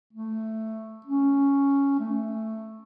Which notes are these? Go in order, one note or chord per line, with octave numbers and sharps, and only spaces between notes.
A3
C#4
A3